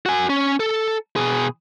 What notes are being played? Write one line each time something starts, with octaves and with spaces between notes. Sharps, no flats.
F#4 G#5
C#4
A4
B2 G#4